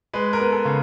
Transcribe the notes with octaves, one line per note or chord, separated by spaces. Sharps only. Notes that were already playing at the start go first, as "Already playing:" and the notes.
G#3 B4
A#4
B3
A4
C#3